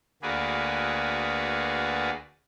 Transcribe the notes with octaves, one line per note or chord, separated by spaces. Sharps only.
D2 A#3 F#4 G#4 B4 D5